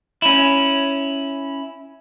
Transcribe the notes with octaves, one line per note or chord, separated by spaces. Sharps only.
C#4 E4